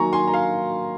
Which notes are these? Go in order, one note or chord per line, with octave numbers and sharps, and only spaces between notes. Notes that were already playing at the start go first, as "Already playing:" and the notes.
Already playing: D#3 F#3 A#3 G#5 A#5 C#6
G#5 C6
A#5
F5 G#5